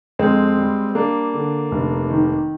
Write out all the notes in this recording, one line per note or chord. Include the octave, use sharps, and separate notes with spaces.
F2 G#3 C4
G3
G3 A#3 D4
D3
F1
D#3